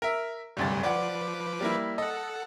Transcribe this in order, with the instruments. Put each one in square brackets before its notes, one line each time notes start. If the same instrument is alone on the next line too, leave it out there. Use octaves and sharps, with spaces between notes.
[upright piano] A#4 E5
[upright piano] F#1 D2 A6 [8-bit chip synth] G2 C3 G3
[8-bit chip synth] F3 B4 D6 [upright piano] D5 F#5
[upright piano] G3 A#3 E4
[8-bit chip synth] A4 F#5 [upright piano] D#5